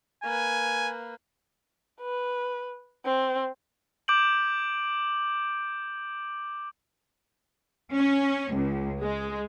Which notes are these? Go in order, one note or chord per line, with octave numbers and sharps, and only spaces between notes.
A#3 B4 G#5
B4
C4
D6 G6 D7 F#7
C#4
C#2
G#3